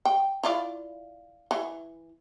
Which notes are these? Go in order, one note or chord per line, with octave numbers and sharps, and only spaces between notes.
G5
E4 F4 D5
E3